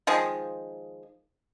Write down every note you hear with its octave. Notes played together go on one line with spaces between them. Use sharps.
D#3 F3 G#3